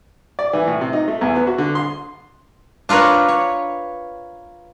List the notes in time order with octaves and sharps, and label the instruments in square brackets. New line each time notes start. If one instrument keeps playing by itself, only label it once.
[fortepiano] D5
E3
A2
C3
D#4
A3
E2
B3
F#4
D3
C6
[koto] D4 F4 A#4 B4 C#5
C#5